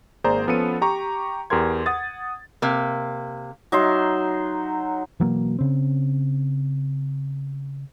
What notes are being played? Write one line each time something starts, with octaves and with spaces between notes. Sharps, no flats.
G#1 A#3 G#4 C5 D5 A#5
F3 B3 C#4 A4 C#7 D#7
G4 A#5 C#6
E2 G4 A#4 C6 G#6
F#5 D#6 A6
C3 A#3
F#3 D#4 E5 C6
B2 E3 F#3 A#3
C#3 C4